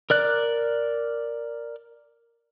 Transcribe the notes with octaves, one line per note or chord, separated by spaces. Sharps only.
A#4 D5 F#6